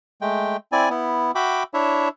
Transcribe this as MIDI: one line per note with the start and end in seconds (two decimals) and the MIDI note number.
0.21 0.57 56
0.21 0.57 57
0.21 0.57 79
0.72 0.89 60
0.72 0.89 64
0.72 0.89 74
0.72 0.89 80
0.90 1.31 59
0.90 1.31 64
1.35 1.63 66
1.35 1.63 76
1.35 1.63 79
1.35 1.63 83
1.35 1.63 86
1.74 2.08 62
1.74 2.08 64
1.74 2.08 73
1.74 2.08 76